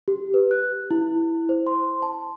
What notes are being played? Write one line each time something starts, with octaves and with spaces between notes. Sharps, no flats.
G4
B4
F#6
E4
C5
C6
A5